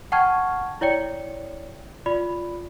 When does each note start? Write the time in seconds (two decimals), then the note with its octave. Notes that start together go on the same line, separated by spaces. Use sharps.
0.12 F#5 G5 A5 C#6 F6 G#6
0.81 E4 C#5 D5 G5 C#7
2.06 F4 D5 B5